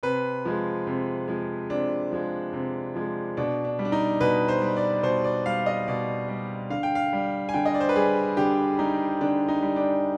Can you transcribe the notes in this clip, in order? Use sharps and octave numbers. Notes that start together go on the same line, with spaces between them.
C3 B4
F3 G#3
C3
F3 G#3
C3 D4
F3 G#3
C3
F3 G#3
B2 D4
D4
G3
D4
D#4
B2 B4
C5
G3
D5
B2 C5
D5
G3 F5
D#5
B2 D5
G3
D3 F5
G5
F5
G3
G#5
D3 G5
D#5
D5
C5
B4
G3 G#4
D3 G4
G3 D#4
D3 D4
D#4
G3
D4